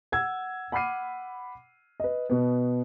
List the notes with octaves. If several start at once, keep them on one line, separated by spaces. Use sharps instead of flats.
F#5 E6 G#6
F#5 B5 D6 F6 C7 D#7
B4 D#5
B2 B3